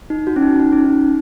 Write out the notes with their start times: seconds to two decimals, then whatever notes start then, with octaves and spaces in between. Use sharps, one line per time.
0.10 D#4
0.27 F#4
0.36 C#4
0.42 D#4
0.60 D#4
0.72 C#4
0.84 D#4